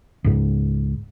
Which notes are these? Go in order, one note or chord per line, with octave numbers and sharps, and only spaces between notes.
C#2 G#2